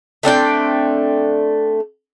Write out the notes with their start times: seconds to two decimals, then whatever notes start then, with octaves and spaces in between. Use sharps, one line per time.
0.23 A3 C4 D4 G5